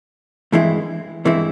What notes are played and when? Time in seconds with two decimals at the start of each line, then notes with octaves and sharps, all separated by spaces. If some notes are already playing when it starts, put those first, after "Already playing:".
0.52 G2 E3 G#3 C4 E4
1.25 G2 E3 G#3 C4 E4